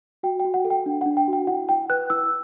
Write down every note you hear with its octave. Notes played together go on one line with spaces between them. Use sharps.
F#4 G5
G5
F#4
F#5
A4
G5
D4
D4 F#5
G5
F#4
G5
E4 F#5
E4 G5
B4 F#6
E4 E6